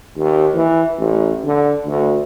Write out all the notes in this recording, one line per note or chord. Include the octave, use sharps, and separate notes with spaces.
D#2
E3
A1
D3
D2